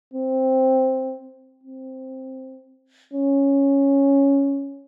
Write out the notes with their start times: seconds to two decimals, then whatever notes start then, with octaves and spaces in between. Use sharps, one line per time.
0.14 C4
1.63 C4
3.13 C#4